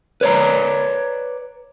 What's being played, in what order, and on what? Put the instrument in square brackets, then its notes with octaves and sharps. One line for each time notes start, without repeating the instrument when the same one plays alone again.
[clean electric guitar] B4 C#5 D5 A#5